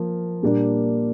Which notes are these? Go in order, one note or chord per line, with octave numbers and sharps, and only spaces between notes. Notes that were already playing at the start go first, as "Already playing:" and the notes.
Already playing: F3 A#3
A#2 G3 A#3 D4